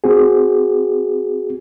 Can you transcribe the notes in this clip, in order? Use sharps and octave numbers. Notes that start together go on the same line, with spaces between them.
C4 F#4 G#4